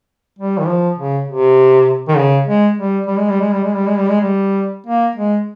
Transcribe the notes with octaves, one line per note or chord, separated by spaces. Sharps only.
G3
D#3
F3
C#3
C3
D#3
C#3
G#3
G3
G3
G#3
G3
G#3
G3
G#3
G3
G#3
G3
G#3
G3
A#3
G#3